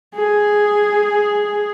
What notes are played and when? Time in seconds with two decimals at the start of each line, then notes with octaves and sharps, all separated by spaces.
0.15 G#4